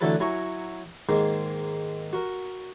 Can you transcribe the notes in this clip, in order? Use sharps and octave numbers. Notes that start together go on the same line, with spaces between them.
D3 E3 F#3 A3 A4 B4
F#3 E4 G#5 A#5 C#6
G#2 D#3 G#3 A#3
F#4 A#4